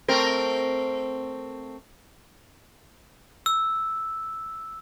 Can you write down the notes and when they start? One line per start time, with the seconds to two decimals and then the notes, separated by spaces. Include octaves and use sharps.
0.08 A3 C4 A#4
3.46 E6